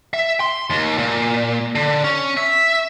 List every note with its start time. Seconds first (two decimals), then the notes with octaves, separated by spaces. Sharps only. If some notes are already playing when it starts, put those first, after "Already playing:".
0.14 E5
0.40 C6
0.70 D#2
0.98 A#2
1.75 D3
2.04 C#4
2.37 E5